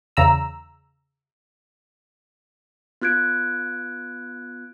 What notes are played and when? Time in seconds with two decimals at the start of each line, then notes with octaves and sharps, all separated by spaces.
0.17 E2 C#3 A#5 E6
3.01 B3 F4 F#6 G#6 D7